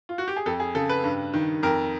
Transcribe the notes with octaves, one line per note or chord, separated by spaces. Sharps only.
F4
F#4
G4
G#4
F2 A4
G#4
C#3 A4
B4
G2
D#3
F2 A#4